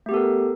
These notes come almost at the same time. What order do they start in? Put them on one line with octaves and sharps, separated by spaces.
A3 G4 B3 A4 A#4